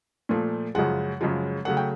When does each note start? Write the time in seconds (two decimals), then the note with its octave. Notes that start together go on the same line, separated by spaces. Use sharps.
0.29 A#2 F3 A3
0.75 F#2 C#3 F3 G#3 F#5
1.21 F#2 C#3 F3 G#3
1.65 C#3 F#3 A3 F#5
1.77 G5